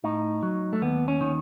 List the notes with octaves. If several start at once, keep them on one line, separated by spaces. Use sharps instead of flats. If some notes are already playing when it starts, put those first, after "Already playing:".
A2 D#4
F#3
A3
D#2 B3
C#4
D#3